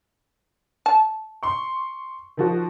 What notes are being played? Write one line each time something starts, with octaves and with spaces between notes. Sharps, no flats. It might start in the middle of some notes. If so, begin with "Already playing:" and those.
A5
C6 C#6
D#3 F3 F#4